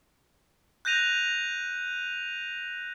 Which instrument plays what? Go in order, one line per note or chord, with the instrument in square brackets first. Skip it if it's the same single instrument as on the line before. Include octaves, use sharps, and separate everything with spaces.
[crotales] F#6 G6 A#6 D#7 F7